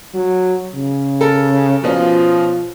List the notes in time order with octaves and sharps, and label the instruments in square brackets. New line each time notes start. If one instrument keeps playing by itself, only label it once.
[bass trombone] F#3
C#3
[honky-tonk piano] A4 A#4
[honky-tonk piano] B2 C#4 F4 [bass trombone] F3